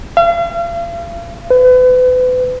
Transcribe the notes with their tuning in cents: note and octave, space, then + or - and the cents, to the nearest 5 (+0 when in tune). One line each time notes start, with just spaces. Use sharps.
F5 -40
B4 +35